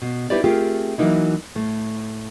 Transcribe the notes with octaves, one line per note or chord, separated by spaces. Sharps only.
B2
D#4 E4 G4 B4 C5 D5
A3 C4 F4 G4 G#4 A#4
E3 F#3 A#3 D#4 E4
A2 A3